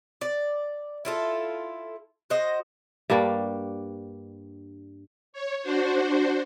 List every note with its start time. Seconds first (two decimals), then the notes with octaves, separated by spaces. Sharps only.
0.21 D5
1.05 E4 F4 A4
2.30 F#4 C5 D#5
3.10 G2 G3 A#3 D4
5.33 C#5
5.62 D4 F#4 C5